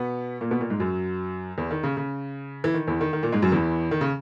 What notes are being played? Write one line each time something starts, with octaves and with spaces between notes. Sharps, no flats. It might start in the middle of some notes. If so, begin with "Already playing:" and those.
Already playing: B2 B3
A#2 A#3
B2 B3
A#2 A#3
G#2 G#3
F#2 F#3
E2 E3
D#3
C#3
C#3
E3
D#3
E2 E3
D#3
D#3
A#2 A#3
G#2 G#3
F#2 F#3
E2 E3
D#3
C#3